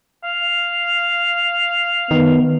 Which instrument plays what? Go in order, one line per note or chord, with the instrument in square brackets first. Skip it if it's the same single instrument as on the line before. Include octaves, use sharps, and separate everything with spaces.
[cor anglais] F5
[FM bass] D#3 [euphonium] B3